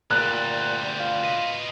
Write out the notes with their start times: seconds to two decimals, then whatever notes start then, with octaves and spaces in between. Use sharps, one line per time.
0.11 D2 A#2 G3 F#6
1.00 F4
1.24 B4 D#5